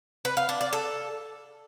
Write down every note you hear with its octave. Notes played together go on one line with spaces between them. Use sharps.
B4
F5
D4
D5
A4